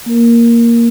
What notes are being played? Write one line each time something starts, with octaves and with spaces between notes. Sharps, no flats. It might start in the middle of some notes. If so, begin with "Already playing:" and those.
A#3 A#4